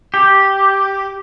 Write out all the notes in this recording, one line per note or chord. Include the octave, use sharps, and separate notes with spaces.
G4